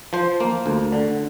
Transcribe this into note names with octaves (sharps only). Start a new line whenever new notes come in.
F3 C5
A#3
D2
D3